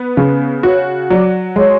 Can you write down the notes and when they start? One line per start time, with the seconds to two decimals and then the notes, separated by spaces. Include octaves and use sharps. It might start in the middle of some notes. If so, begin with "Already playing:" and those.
Already playing: B3
0.17 C#3
0.63 F#4 C#5
1.10 F#3 D5
1.56 G#3 C#5